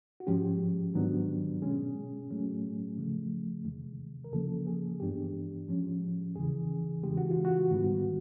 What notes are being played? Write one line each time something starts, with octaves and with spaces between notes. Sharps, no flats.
F#4
G#2 F3 G#3 C#4 G4
G#2 D#3 F#3 B3 D4
B2 G#3 C#4 G#4
A2 F#3 A3 C#4
C#3 F3 A3
E2 C3 D#3 G#3
A#4
E2 C#3 F3 A#3 C#4 A4
G#4
G2 E3 G#3 B3 D4 G4
A2 F3 G#3 C#4
E2 C#3 E3 G#4
E2 C#3 E3 G#3 G4
F#4
F4
F#4
G#2 D#3 G3 B3